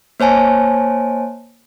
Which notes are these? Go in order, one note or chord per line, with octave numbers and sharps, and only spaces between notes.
A#3 C5 C#5 G#5 A5